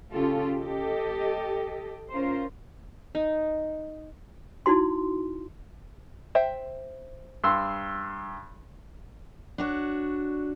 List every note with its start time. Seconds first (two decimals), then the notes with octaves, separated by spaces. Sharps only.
0.12 C#3 C#4 F4 G4 A4
0.57 G4 A4 D#5
2.12 C#4 F4 A#4 C5
3.15 D#4
4.66 D#4 E4 F#4 C6
6.35 C5 E5 G5
7.44 G2 C6 E6
9.58 D4 F#4 C#5